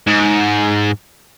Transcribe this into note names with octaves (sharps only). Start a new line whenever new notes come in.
G#2